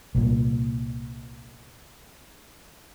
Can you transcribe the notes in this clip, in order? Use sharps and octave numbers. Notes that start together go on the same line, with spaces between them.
C2 A#2